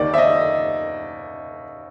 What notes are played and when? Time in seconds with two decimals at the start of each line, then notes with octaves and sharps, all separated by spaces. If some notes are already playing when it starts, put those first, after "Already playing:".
Already playing: D#2 D#3 D5
0.14 E5
0.18 D#5